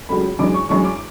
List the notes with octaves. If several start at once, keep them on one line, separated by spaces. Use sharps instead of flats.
C#2 C#3 F#3 A3 B5
F#2 E3 G#3 D6
C#6
F#2 E3 G#3 C#6
D6